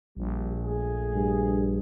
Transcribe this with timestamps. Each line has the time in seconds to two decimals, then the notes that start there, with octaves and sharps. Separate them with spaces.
0.17 A#1 G3
0.64 A3 G#4
1.14 G2